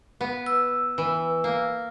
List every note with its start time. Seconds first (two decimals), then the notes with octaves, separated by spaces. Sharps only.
0.21 B3
0.46 E6
0.98 E3
1.44 A#3